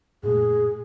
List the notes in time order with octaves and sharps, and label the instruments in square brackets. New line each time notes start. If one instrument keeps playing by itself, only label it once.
[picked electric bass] F#2 A#2 A3 [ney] G#4